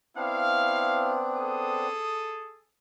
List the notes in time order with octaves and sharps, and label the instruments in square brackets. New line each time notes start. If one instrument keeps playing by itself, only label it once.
[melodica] B3 C4 D4 [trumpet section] E4 F5
[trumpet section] G#4 A4 D#6